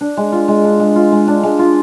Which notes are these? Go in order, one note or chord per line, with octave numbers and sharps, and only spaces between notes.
D4
G#3
F4
G#3
D4
G#3
F4
G#3
D4
G#3
F4